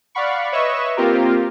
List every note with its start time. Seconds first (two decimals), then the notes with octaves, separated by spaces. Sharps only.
0.15 D5 F5 F#5 B5 C#6
0.52 B4 C#5 D#5 E5 C#6 E7
0.97 A#3 C4 F4 G4 A#4